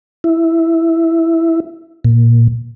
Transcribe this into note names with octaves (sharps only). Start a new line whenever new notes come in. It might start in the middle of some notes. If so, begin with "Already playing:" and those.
E4
A#2